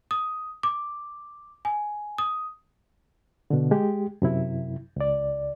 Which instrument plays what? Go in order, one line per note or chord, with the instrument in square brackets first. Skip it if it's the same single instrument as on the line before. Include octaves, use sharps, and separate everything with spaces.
[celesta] D#6
D6
G#5
D#6
[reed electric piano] B2 D3
G#3 G4
F#2 C3 E4
C#2 D5